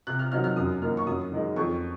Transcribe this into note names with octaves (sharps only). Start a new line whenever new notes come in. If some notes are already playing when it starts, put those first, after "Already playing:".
C3 F#6
F6
D#3 F#3 C4 D#4 F6
F6
F#2 D#6
D#3 A#3 F6
C#6
F#2 D#6
D#3 G#3 D#4
F2 C#6